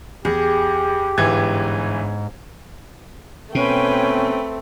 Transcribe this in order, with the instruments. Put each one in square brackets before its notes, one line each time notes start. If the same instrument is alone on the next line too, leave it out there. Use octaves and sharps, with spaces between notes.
[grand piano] E2 [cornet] G4 [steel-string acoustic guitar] G#4
[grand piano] G1 E3 G#6 [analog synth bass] G#2
[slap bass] B2 [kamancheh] A3 C4 [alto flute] C#4 [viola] B4 G5